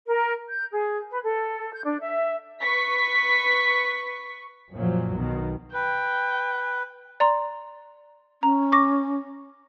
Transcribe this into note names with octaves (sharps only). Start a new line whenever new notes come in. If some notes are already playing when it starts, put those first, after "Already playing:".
A#4
G6
G#4
B4
A4
G6
D4
E5
B4 C#6 B6
F#2 A#2 F3 F#3
B1 B2 D#3
B4 G5
D5 A#5 C6
C#4 A#5
C#6 D6 A#6